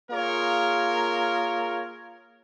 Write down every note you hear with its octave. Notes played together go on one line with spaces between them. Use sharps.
A#3 F4 G#4 A#4 C#5